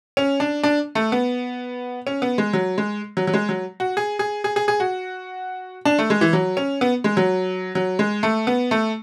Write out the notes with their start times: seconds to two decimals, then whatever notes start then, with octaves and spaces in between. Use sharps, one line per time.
0.17 C#4
0.40 D4
0.63 D4
0.95 A3
1.12 B3
2.07 C#4
2.22 B3
2.38 G#3
2.53 F#3
2.78 G#3
3.17 F#3
3.27 F#3
3.33 G#3
3.49 F#3
3.80 F#4
3.97 G#4
4.19 G#4
4.44 G#4
4.56 G#4
4.68 G#4
4.80 F#4
5.85 D4
5.99 A3
6.10 G#3
6.21 E3
6.33 F#3
6.57 C#4
6.81 B3
7.04 G#3
7.17 F#3
7.75 F#3
7.99 G#3
8.23 A3
8.47 B3
8.71 A3